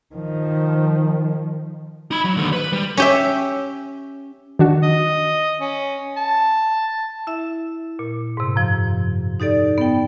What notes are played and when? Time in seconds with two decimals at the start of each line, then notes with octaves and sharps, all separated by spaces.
0.15 D#3 F3
2.11 D#4 B5
2.25 F#3
2.37 D#2 D3
2.53 B4
2.72 G3
2.97 C#4 G4 E5
4.59 D#3 D4 F#4
4.83 D#5
5.61 C#4
6.16 A5
7.27 E4 E5
7.99 A#2
8.37 G#2 C3
8.56 F#2 F3
9.40 D#4 G4 A4 D5
9.78 B3 G5